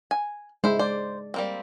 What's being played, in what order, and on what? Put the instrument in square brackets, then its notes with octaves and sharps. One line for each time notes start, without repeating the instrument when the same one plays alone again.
[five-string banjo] G#5
[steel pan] G#3 [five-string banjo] E4 C5
[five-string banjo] C5 [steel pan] D5
[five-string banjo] G3 A#3 C4